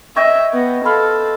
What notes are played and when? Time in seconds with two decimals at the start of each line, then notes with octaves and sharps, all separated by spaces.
0.16 C#5 D#5 E5 G5
0.53 B3
0.85 A4 F5 B5 C6